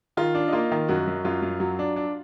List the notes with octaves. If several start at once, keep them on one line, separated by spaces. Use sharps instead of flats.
D#3 F4
D4
D#4
A#3 F4
D#3
F#2 F#4
F#2
F#2 F4
F#2
F#3
D4
D4